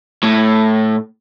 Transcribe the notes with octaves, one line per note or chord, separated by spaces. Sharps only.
A2